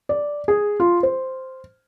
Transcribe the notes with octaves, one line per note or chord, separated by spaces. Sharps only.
D5
G#4
F4
C5